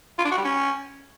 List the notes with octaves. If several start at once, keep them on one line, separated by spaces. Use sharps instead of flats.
F4
D4
F#4
G3
C#4